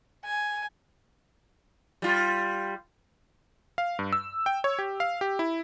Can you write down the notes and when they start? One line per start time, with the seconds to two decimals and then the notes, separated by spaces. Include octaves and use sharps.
0.25 G#5
2.02 G3 F4
3.78 F5
3.99 G2
4.13 E6
4.46 G5
4.64 C#5
4.79 G4
5.00 F5
5.21 G4
5.39 E4